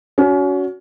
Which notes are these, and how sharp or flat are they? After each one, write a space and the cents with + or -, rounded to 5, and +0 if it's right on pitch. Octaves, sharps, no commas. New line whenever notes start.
C#4 +30 F#4 +0